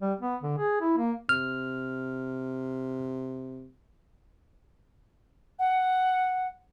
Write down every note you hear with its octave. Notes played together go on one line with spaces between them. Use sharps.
G3
B3
D3
G#4
E4
A#3
C3 F6
F#5